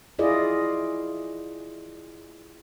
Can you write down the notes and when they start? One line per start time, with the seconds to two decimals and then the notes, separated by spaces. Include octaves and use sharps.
0.19 E4 F4 G#4 D5 D#5